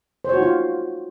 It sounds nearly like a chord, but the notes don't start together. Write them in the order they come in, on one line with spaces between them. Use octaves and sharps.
C5 C#5 F#4 D#4 F4